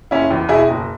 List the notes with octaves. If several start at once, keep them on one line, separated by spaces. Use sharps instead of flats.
F#1 C#4 E4
E2
B2 E4 G#4
F#1